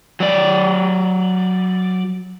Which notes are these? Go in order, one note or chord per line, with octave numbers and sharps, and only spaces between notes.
F#3 D5